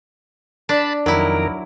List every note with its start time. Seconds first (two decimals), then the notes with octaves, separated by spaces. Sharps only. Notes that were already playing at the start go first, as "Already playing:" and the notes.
0.69 D4 A5 B5
1.06 F2 D#3 F#3 E4 A#4